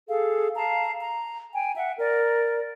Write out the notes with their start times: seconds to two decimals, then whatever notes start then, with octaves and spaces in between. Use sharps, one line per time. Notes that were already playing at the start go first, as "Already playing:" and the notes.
0.08 G#4 A4 F5
0.56 F5 A5 A#5
1.00 A#5
1.53 G5 G#5
1.77 E5 F#5
1.99 A#4 D5